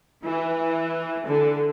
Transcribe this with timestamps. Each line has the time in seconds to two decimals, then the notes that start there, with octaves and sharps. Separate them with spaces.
0.24 E3
1.28 D3